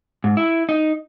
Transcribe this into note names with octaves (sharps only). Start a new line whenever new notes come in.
G#2
E4
D#4